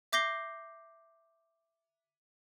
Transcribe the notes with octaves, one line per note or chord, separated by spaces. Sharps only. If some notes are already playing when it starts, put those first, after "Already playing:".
E5 D6 G6 A#6 C7 G7